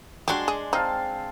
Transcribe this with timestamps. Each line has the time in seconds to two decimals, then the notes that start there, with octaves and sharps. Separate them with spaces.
0.28 F#3 G#3 D4 G4 C6
0.48 G#4
0.73 C4 D#4 F5 A5